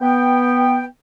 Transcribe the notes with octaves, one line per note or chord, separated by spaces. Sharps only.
B3 G5